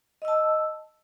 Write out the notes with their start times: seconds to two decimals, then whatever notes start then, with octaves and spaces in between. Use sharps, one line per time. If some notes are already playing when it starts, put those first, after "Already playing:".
0.22 D#5
0.25 E6
0.28 A5